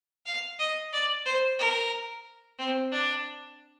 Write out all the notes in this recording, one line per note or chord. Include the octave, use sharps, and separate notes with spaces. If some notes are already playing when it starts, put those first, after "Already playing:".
F5
D#5
D5
C5
A#4
C4
D4